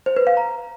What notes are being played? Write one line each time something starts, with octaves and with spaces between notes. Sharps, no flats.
C5
B4
F5
A#5